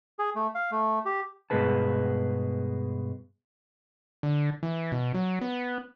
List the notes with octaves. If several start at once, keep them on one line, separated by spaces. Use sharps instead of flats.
G#4
A3
F5
A3
G4
G2 B2 G#3 G#4 B4 A5
D3
E3
B2
F#3
B3